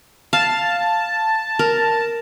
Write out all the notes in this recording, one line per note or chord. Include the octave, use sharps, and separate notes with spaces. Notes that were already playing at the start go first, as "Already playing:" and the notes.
F5 A5
A#4